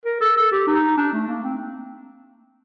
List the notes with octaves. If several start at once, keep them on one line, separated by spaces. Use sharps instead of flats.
A#4
A4
A4
G4
D#4
D4
A3
A#3
C4